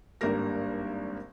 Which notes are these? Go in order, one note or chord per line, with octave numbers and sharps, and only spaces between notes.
G#1 G2 A#3 G4 A#4 A#6